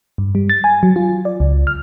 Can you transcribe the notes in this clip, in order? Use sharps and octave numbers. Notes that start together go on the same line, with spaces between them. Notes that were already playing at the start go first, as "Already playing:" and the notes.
G2
G3
A6
G#5
F#3
F4
D5
C#2
F6